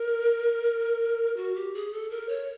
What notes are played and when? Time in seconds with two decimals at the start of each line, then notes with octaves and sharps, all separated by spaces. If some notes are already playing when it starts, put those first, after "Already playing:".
Already playing: A#4
1.37 F#4
1.55 G4
1.74 G#4
1.92 A4
2.10 A#4
2.29 C#5